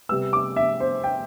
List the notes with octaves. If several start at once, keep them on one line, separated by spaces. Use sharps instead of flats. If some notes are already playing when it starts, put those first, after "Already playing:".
C3 G3 B3 E6
D6
E5
C5
G5